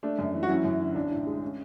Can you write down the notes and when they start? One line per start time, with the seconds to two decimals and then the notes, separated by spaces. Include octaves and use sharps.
0.03 A3 D4
0.19 F#2
0.34 E3
0.43 F#4
0.49 F#3 C#4 E4
0.64 F#2
0.80 D3
0.95 B1 D4
1.11 A2
1.27 G#3
1.42 C#4